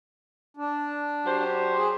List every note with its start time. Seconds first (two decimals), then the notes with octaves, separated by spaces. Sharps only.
0.57 D4
1.25 F#3 G4 C5
1.77 G#4